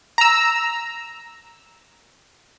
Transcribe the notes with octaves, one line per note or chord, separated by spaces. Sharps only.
A#5 E6